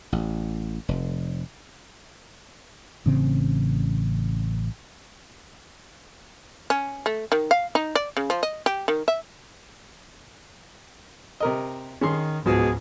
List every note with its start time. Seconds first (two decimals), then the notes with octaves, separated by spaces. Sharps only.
0.12 A1
0.89 F1
3.06 A1 C#3 C4
6.70 C#4
7.06 A3
7.32 D#3
7.51 F5
7.75 D#4
7.95 D5
8.17 C#3
8.30 F3
8.43 D#5
8.66 G4
8.88 D#3
9.08 E5
11.40 C3 A#4 D#5
12.01 D#3 C#4 G#4 C6
12.46 C#2 G#2 B2 F3 G#4